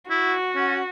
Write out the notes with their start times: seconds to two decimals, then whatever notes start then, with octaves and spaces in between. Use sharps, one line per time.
0.10 E4 F#4
0.55 C#4